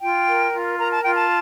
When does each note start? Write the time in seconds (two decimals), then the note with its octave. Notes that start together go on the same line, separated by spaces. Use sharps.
0.01 F4 G5
0.27 A#4
0.53 F4
0.79 A#4 A#5
0.90 A5
1.02 F4 G5
1.14 A5